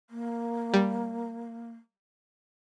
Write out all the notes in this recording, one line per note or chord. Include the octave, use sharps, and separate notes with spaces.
A#3
G3